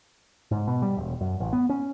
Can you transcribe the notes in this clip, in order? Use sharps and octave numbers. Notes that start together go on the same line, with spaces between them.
G#2
B2
G3
E1
F#2
A1
B3
C#4